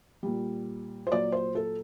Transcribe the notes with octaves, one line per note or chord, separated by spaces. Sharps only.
A#2 G3
C5
A#2 F#3 D5
C5
A4